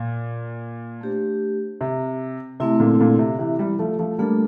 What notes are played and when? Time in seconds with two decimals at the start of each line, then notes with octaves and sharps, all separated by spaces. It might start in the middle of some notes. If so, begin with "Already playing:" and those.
Already playing: A#2
1.01 A3 D4 G4 C5
1.81 C3
2.60 C3 A3 C4 E4
2.80 A#2 D3
2.99 A#2 D3
3.19 C3
3.39 C3 E3
3.59 E3 G3
3.79 F3 A3
3.99 F3 A3
4.18 G3 A3 A#3 D4 A4